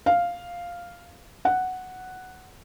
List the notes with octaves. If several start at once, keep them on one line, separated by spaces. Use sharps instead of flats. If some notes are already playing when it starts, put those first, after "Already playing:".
F5
F#5